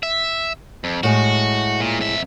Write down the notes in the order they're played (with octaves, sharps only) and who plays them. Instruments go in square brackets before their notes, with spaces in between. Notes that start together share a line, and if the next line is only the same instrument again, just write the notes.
[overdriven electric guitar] E5
F2
[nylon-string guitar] A2 G#3 [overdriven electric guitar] F#4
[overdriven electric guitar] A#2
F2 E5